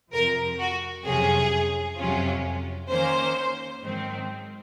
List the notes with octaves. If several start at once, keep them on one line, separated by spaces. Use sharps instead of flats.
F2 C3 F3 A#4
F#4
F2 C3 F#3 C#4 G#4
F2 C3 F#3 C#4 F4
D#3 A#3 C#4 C5
G#2 D#3 F#3 C4